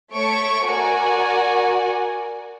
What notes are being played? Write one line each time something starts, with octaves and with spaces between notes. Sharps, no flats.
A3 C#5 A5 C#6 D7
F#4 A#4 D5 G#5